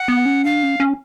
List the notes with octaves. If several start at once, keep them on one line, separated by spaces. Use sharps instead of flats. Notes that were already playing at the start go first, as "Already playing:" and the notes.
Already playing: F#5
B3
C#4
D4 F5
C#4
C#4